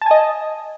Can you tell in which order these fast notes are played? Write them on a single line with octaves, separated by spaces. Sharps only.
A5 G#5 D#5